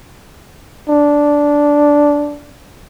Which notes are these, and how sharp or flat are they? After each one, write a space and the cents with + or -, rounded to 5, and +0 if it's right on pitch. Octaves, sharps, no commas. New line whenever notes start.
D4 -10